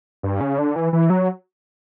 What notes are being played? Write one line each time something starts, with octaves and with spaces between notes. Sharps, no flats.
G2
C#3
D3
E3
E3
F#3